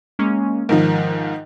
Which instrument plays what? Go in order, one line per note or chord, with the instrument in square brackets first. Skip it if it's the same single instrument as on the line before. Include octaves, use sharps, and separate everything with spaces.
[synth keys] G#3 A#3 C#4
[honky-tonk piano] G#2 D#3 F3 [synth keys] A#4